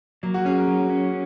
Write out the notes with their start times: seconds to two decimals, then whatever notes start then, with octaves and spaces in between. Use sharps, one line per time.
0.23 F#3 A#3
0.34 F#4
0.45 C#4 G#4
0.57 A#4
0.68 F#3
0.90 C#4